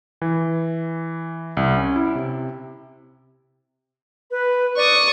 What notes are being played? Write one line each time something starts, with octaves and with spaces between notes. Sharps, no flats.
E3
C2
C#4
E4
C3
B4
D5 C#6 D#6